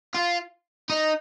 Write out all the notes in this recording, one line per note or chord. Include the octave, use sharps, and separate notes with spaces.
F4
D#4